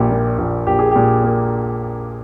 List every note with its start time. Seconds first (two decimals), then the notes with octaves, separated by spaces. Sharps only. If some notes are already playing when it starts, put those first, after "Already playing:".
Already playing: A#1 A#2 A#3 G4
0.10 A#2
0.38 A#1
0.67 A#1 G4
0.79 G#4
0.91 A#2 G4
1.24 A#3